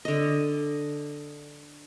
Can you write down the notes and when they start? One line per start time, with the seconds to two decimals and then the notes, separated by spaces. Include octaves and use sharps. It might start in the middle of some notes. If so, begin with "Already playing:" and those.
0.05 D3 D#5